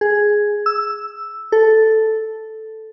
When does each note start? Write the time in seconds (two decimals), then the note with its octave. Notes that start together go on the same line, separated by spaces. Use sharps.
0.01 G#4
0.66 E6
1.52 A4